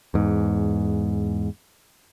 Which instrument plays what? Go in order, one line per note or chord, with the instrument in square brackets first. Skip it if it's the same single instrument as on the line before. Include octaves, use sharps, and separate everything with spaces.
[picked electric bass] E2 G#2